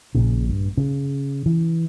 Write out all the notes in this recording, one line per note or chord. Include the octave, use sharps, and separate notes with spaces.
A#1 A#2 C#3
G2
C#3
E3